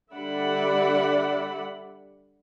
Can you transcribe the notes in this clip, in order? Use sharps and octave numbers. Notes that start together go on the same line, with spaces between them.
D3 G3 D5 E5 F#5 B5